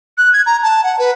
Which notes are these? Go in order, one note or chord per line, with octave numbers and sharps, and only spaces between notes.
F#6
G#6
A#5
A5
F#5
B4